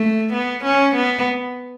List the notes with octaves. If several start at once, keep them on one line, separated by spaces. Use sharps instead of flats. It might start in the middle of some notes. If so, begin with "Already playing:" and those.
Already playing: A3
B3
C#4
B3